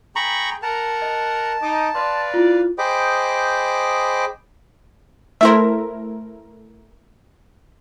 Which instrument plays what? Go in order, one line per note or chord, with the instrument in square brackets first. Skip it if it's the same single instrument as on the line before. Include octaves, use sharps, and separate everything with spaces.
[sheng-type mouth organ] G#4 G5 [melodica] A#5 B5 C#6
[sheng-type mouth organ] A#4 F#5 A#5 [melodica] A5
[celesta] D#5
[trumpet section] D#4 [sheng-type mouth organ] D#5 D6
[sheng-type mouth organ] B4 F5 [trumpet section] D5 [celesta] C6
[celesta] E4 F4
[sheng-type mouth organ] G#4 C5 D#5 G5 B5 D6
[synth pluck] A3 E4 A#4 [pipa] C5 E5